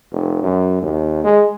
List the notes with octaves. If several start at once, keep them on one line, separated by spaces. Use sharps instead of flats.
F1
F#2
D#2
G#3